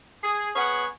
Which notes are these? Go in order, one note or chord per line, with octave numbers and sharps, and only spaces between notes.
G#4
B3 G#4 C#5 F#5